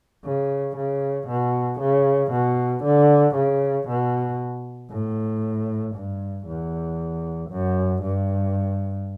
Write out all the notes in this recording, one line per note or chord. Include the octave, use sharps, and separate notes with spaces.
C#3
C#3
B2
C#3
B2
D3
C#3
B2
A2
G2
E2
F#2
G2